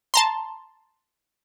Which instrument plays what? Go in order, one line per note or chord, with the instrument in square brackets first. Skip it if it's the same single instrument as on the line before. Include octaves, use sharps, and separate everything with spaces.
[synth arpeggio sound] A5 A#5 C6